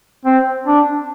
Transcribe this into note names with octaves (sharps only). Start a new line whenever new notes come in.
C4
D4